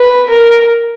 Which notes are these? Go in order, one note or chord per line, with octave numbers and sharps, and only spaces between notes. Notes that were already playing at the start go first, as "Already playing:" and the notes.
Already playing: B4
A#4